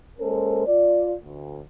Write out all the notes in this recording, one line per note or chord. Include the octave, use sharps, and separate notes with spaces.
G#3 A#3 C#4 A4 A#4 C5
F4 D5
D2